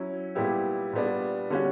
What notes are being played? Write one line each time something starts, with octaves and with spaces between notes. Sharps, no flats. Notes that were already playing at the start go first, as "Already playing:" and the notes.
Already playing: F#3 C#4 E4
A#2 G3 B3 E4 G4
A#2 G3 B3 D4
D3 G3 C#4 F#4